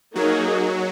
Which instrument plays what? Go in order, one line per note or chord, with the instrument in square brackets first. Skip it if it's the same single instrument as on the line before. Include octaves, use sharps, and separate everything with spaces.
[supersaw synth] F#3 [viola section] A#3 D#4 G#4